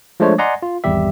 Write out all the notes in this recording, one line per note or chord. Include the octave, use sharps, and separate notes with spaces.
F3 G#3 A3 D4 C5 C#5
D5 D#5 F#5 G#5 A#5 C6
F4
G#1 E2 G3 G4 E5